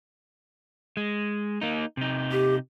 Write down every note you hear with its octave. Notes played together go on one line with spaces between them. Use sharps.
G#3
A#3 D#4
C3 D#4
G4